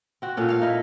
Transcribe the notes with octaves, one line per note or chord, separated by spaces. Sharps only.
C4 F#4
A#2 C#4 A4
C#5 F5
D#4 E4 D#5